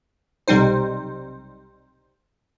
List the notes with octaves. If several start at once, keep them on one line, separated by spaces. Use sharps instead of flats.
B1 C3 G3 C4 D#4 C5